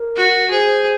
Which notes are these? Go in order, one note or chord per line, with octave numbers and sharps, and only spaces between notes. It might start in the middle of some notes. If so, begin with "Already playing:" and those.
Already playing: A#4
F#4
G#4 C5